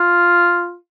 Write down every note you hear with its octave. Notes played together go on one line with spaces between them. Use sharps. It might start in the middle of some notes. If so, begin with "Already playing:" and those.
Already playing: F4